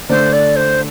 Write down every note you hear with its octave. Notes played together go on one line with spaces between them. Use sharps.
D3 A3 D4 C5
D5
C5